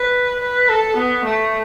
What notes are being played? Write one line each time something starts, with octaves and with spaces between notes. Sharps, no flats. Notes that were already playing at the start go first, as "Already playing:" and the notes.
Already playing: B4
B4
A4
B3
A3